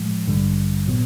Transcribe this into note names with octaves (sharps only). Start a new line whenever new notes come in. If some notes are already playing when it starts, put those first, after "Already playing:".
Already playing: A2 F3 G#3
A1 G2 D3 G3
A#2 F#3 B3